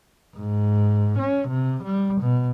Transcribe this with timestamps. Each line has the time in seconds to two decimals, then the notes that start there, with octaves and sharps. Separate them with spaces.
0.36 G#2
1.19 C#4
1.48 C3
1.84 G3
2.21 B2